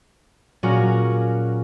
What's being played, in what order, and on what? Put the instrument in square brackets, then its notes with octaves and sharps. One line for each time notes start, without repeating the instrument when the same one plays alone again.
[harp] A#2 F#3 C#4 F#4 G#4 A#4